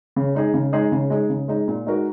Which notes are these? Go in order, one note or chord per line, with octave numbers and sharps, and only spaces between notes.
C#3
G#3 D#4 G#4
C#3
G#3 D#4 G#4
C#3
G#3 D#4 G#4
C#3
G#3 D#4 G#4
A#2
G#3 D#4 F#4 A#4